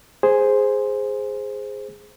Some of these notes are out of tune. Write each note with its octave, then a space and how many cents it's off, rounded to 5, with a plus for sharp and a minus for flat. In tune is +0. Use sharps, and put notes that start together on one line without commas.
G#4 -5 C5 +0